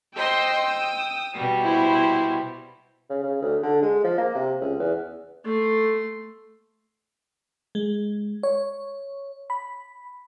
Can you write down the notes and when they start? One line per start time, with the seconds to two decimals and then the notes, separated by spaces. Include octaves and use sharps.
0.16 C5 D#5 G5 C6 E6
0.66 D#6
1.34 B2 G3
1.63 E4 C5
3.10 C#3
3.23 C#3
3.42 D2
3.63 D3
3.83 G#3
4.04 F3
4.18 A#3
4.35 C3
4.61 C#2
4.80 E2
5.44 A3 C6
7.75 G#3
8.43 C#5
9.50 B5